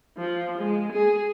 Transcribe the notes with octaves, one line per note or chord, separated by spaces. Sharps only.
F3
G#3
G#4